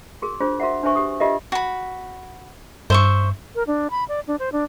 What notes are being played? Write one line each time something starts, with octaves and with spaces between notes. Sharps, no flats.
F#4 G#4 A#4
D4 F4 F#4 G#4 C5
F#4 A#4 C5 E5 F#5
D4 B4 C5 E5 G#5 C#6
G4 D#6
F4 G4 A#4 B4 D#5 E5
F#4 B5
G2 C5 E5 C#6
A#4
D4
B5
D5
D4
C5
D4